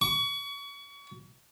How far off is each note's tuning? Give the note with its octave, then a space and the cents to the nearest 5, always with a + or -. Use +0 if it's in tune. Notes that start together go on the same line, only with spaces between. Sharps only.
C#6 +30